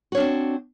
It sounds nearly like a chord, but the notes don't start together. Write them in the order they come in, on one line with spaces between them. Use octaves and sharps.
F#4 C#5 D4 C4